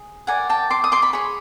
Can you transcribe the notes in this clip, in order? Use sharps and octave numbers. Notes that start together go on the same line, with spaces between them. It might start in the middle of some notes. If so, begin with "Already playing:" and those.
Already playing: G#4
G4 A#4 D5 F#5 G#5
G5 A5
C6 D6
D#6
C6 D6
B5 C#6
G#4 C#5 B5 C#6